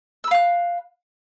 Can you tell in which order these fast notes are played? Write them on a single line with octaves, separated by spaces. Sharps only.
E6 B5 F5 F#6